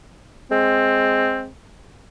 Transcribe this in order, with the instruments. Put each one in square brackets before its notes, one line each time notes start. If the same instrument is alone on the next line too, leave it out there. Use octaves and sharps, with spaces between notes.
[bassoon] G#3 [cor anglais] C4